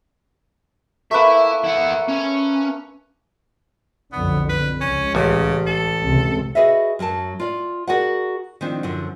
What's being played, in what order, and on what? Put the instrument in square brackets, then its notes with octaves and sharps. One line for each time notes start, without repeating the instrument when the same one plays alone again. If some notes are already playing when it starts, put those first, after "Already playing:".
[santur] A3 A#3 B4 [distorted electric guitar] E4 E5
[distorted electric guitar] E4 F#5
C#4
[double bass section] B1 F2 D3 [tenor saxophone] B3
[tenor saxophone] B4
[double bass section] C#2 [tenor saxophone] C#4
[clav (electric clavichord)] A1 [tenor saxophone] C#3
[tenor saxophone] A4
[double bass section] C#2 C3
[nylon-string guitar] F#4 G#4 B4 D#5 E5
F#2 F#3 G5 A5
F4 D5
F#4 G#4 A#4 D5 F#5
D#3 F3 C4 D4 F4
F#2 D3 F3